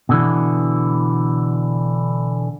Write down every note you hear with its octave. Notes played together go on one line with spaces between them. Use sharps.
B2 D3 E3